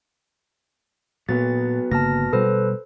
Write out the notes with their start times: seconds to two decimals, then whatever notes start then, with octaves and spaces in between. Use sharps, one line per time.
1.29 A#2 F#3 B3 A6
1.91 G1 C#3 A#3 A5 F6 A#6
2.33 B2 G3 A4 B4 C5